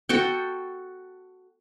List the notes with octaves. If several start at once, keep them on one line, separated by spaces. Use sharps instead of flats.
F#4 A4 G5